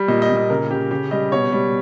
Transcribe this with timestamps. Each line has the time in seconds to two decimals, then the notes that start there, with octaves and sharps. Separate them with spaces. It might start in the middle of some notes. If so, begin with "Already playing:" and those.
Already playing: G3
0.08 A#2 D#5
0.22 D#5
0.30 A#2
0.36 D#5
0.50 C#3 A#4
0.70 C#3 G4
0.91 C#3 G4
1.11 G3 D#5
1.32 B2 C#5
1.53 G3